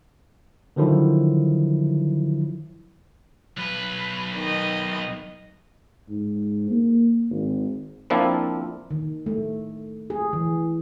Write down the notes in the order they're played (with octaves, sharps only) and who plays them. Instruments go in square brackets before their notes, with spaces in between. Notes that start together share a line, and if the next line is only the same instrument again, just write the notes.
[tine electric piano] D3 D#3 F3 F#3 E4
[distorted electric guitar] B1 B4
[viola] D#3 D#5
[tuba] G#2
A#3
G#1
[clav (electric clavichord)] F3 A#3 C4 D4 E4 F4
[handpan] D#3
A3
G#4
E3